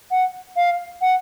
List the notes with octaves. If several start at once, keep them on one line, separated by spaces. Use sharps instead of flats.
F#5
F5
F#5